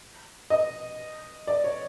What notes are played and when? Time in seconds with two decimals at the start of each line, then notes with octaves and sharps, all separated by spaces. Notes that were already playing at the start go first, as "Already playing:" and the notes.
0.50 D#5
1.47 D5
1.64 C#5